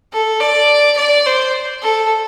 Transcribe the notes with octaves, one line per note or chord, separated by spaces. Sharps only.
A4
D5
D5
C5
A4